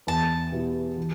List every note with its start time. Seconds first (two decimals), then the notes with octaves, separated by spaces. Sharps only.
0.07 E2 A5
0.52 B2 B3 E4 G4
0.97 E3